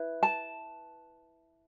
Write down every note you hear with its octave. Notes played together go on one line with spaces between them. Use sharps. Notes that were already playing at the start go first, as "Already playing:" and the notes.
Already playing: E4 B4
A5